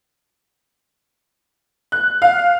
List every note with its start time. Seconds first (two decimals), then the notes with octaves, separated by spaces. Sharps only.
1.92 F#6
2.22 F5